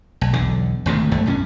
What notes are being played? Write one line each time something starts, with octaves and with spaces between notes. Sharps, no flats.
B1
B1 E2 D3
G#1 D2 C3 D#3
C2 F#2 A3
B1 G2 C4 C#4